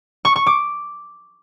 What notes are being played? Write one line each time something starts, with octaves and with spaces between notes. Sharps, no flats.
C#6
C#6
D6